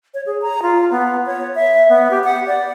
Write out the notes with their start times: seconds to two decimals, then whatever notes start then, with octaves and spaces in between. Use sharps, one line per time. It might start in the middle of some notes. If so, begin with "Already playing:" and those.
0.14 C#5
0.26 G#4
0.42 A#5
0.62 F4
0.91 B3
1.26 C#5
1.55 E5
1.89 B3
2.11 G4
2.24 F#5
2.47 D5